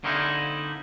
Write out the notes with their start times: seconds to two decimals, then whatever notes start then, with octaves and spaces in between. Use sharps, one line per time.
0.04 D3 A#3 C4 D#4 E4